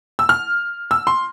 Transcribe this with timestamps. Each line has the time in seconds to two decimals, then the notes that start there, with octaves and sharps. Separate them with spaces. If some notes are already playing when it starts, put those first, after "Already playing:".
0.19 E6
0.29 F6
0.91 E6
1.07 C6